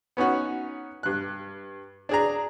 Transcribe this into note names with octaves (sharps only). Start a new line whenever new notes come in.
B3 C#4 D#4 F#4
G2 F#6
D4 G#4 A#5